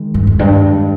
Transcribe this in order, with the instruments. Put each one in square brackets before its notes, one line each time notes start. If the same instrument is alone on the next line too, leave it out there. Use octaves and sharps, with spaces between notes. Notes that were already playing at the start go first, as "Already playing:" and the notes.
Already playing: [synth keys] D#3 G#3
[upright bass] G2
E2
[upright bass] G2 [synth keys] G#3